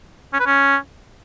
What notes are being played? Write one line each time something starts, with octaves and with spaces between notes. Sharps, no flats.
C#4
B4
C#4